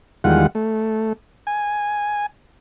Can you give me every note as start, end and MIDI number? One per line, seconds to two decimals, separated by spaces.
0.24 0.47 40
0.24 0.47 51
0.24 0.47 55
0.24 0.47 56
0.24 0.47 65
0.24 0.47 78
0.55 1.13 57
1.47 2.26 80